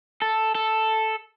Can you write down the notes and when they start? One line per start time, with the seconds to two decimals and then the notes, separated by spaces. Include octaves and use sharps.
0.22 A4
0.55 A4